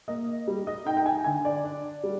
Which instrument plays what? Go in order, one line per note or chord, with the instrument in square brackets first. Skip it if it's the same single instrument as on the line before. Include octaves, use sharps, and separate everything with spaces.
[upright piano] A#3 D#5
G3
D#5
D#4 G5
G5
G#5
D3 G#5
D5
D4
G3